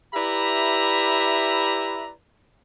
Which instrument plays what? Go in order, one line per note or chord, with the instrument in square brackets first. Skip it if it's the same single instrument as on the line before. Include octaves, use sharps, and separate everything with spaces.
[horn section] E4 G4 B4 D5 E5 A#5